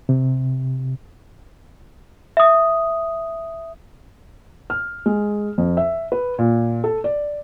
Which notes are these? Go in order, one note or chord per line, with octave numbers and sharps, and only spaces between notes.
C3
E5 D#6
F6
G#3
F2
E5
B4
A#2
A4
D5